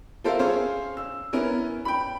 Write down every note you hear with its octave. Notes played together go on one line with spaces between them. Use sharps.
F4 A4 A#4 C5 E5 F5
C#4 G#4 C5 C#5 F5
E6
B3 C#4 E4 A#4
G5 B5